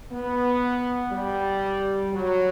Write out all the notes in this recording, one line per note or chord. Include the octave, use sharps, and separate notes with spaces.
B3
G3
F#3